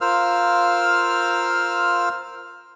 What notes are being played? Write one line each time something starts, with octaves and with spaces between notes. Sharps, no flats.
F4 A#4 C5 F5 E6 F6